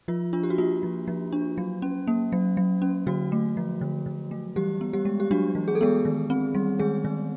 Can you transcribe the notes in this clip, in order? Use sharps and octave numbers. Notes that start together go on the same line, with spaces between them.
F3 F4
D4 F4
G4
F#4
A#3 F4
F3
F3
D4
F#3
C#4
A#3
F#3
F#3
C#4
D3 F#3 F#4
A3
F3
D3
D3
A3
E3 G3 G4
B3
G3 G4
G#3
G4
F#3 D4 F#4
E3
G#4
A4
G#3 B3 G#4
D#3
C4
G3
D#3 G#3 G#4
D#3